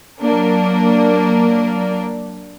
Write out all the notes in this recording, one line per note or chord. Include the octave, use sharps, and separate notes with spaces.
F#3 A#3 D4 A#4